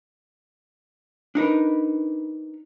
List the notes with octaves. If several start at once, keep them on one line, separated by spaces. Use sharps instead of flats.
D4 D#4 A#4 B4